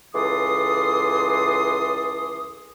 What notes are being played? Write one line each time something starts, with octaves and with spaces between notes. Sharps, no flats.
C#2 E3 A4 C6 D6 D#6